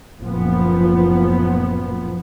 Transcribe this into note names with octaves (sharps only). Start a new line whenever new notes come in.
F#1 A#2 F3 B3